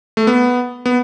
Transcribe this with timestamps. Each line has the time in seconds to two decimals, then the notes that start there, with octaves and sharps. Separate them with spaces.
0.17 A3
0.27 B3
0.86 B3